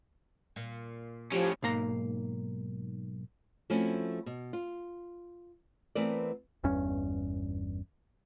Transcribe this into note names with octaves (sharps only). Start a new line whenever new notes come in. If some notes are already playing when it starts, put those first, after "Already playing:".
A#2
A2 F3 C#4 G4
B1 G#2 A#3 A#5
F3 A3 C4 C#4 E4 F#4
B2
F4
E3 A3 B3 C4 A#4 D5
G1 E2 G2 C#4